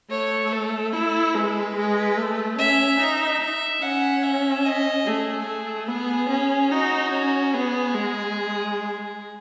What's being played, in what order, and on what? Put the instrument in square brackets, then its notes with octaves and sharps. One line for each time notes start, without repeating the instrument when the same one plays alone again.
[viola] A3 [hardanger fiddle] C#5
[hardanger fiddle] A4
[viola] E4
[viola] G#3 [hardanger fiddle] B4
[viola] G#3
A3
[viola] C#4 [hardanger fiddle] E5
[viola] D#4 [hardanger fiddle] E5
[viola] C#4 [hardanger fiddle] F#5
[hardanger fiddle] E5
D#5
[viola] A3 [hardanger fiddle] G#4
[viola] A3
[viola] B3 [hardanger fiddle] G#4
[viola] C#4
[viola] D#4 [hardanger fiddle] F#4
[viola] C#4
[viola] B3 [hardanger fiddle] G#4
[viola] G#3